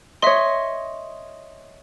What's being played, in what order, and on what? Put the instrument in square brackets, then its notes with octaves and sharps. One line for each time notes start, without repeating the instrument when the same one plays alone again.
[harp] C#5 D#5 [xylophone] E5 C6